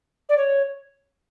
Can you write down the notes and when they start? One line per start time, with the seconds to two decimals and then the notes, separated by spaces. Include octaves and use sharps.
0.29 D5
0.37 C#5